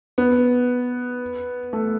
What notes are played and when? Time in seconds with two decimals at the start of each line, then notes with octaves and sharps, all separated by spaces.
0.18 B3
1.73 A3